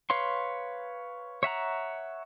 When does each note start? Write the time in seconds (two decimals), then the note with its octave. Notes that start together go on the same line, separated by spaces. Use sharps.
0.10 B4 C#5 F5 C6
1.43 C#5 E5 F#5 A#5